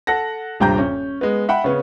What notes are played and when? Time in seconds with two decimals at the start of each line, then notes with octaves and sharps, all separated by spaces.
0.07 A4 F#5 A#6
0.60 D#1 G2 C3 G5 A#5 G6
0.78 C#4
1.21 G#3 B3
1.49 E5 F#5 G5 B5
1.64 C#3 B3 C#4